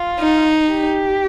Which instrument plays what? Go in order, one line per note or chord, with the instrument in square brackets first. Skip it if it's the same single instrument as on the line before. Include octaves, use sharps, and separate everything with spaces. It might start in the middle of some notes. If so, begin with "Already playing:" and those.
Already playing: [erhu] F4
[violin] D#4
[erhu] G4